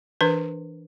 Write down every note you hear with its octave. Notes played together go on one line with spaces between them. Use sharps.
E3 D4 A#4 B4